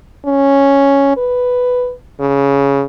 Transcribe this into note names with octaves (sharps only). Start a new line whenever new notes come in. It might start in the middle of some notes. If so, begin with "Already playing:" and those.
C#4
B4
C#3